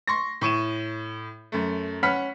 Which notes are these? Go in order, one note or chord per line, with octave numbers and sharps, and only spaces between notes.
C6 C#6 A#6
A2 C#6 D#7 E7
F#2 A3
C#4 F#5 B5 F6 B6